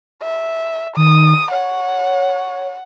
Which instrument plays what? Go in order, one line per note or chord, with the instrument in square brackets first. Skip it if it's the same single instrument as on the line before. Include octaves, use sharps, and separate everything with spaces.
[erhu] E5
[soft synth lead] D#3 [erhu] D#6
[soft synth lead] C#5 [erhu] F#5